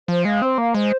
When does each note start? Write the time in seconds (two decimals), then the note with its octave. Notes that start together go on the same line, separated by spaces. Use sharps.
0.08 F3 C5
0.25 G#3 F5
0.42 C4 C5
0.58 A#3 F5
0.74 G#3 C5